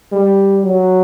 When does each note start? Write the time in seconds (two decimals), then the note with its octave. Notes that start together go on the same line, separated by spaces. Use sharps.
0.12 G3
0.64 F#3